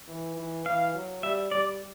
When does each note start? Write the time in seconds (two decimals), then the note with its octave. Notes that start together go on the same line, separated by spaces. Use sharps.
0.08 E3
0.37 E3
0.66 E3 F5
0.94 F#3
1.23 G3 E5
1.51 G3 D5